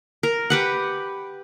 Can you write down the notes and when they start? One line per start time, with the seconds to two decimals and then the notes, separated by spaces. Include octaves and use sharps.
0.23 A#4
0.50 G4 B4 F#5